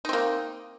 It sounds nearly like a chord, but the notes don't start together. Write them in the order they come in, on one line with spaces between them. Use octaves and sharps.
D#4 C4 A#3